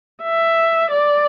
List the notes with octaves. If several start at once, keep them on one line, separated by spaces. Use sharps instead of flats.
E5
D5